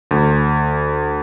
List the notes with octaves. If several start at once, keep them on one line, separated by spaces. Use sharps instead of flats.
D2